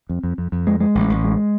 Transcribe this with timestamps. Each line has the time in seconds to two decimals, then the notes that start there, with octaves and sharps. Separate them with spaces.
0.09 F2
0.23 F2
0.38 F2
0.52 F2
0.67 G#3
0.80 G#3
0.95 A1
1.10 A1
1.24 G#3